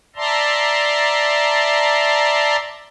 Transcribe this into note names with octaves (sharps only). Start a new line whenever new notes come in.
D5 E5 A5 A#5 C6